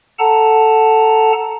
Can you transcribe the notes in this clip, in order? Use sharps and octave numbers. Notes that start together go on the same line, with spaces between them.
A4 F#5 A5 A#5